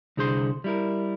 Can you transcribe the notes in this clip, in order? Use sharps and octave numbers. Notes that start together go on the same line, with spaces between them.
C2 D3 G#4 C5 C6
G3 E4 A#4